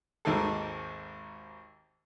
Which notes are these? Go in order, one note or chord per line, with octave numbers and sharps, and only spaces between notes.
G#1 D#2 G#2 D#3 G#4 A4